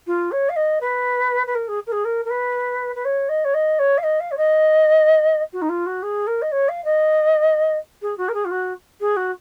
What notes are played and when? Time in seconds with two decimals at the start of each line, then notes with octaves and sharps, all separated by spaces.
0.07 F4
0.32 C#5
0.49 F5
0.56 D#5
0.81 B4
1.47 B4
1.55 A#4
1.68 G#4
1.87 A#4
1.92 G#4
2.05 A#4
2.25 A#4
2.30 B4
2.96 B4
3.05 C#5
3.29 D#5
3.45 C#5
3.54 D#5
3.79 C#5
3.98 F5
4.03 D#5
4.20 F5
4.31 C#5
4.37 D#5
5.53 F#4
5.62 D#4
5.69 F4
5.86 F#4
6.03 G#4
6.27 A#4
6.42 D#5
6.52 C#5
6.69 F5
6.85 D#5
8.02 G#4
8.18 F#4
8.29 A#4
8.34 G#4
8.45 F4
8.51 F#4
9.01 G#4
9.17 F#4